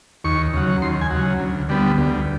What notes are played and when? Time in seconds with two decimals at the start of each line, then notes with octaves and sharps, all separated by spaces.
0.24 D#2 C#6
0.53 C#3 F#3
0.82 D#2 C6
1.01 G#5
1.11 C#3 F#3
1.40 D2
1.69 D3 G3 B3
1.98 D2